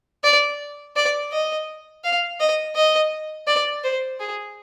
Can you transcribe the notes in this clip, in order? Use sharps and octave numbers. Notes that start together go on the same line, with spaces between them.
D5
D5
D#5
F5
D#5
D#5
D5
C5
G#4